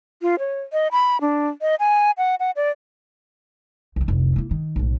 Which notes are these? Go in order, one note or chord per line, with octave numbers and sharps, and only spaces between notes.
F4
C#5
D#5
B5
D4
D#5
G#5
F#5
F#5
D5
C2 D#3
F1 C2
A#3 E4
D#3
B1 A2